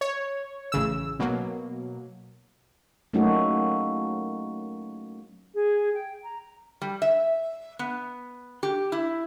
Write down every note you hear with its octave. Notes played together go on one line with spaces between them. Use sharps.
C#5
A1 C#3 E6
B2 F#3 A#3
F#3 A3 A#3 C#4 D#4 F#4
G#4
G5
A#5
G3
E5
B3
G4
E4